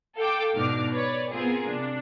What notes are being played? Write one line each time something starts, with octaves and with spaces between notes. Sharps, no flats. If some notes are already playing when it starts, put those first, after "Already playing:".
A4 F5 G5 D6
G#2 B2 D4 D#4 D6 F6
B4 C#5 D5
B3 C4 F4 G#4 A#4
C3 D4